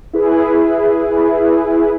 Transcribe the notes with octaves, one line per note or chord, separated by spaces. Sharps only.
E4 G#4 B4